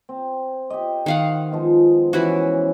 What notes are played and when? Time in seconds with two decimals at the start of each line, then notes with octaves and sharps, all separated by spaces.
0.09 C4
0.70 G4 D#5
1.06 D#3 F5 F#5
1.51 F3 G#3 B3
2.13 C#3 E3 C#4 E4 F#4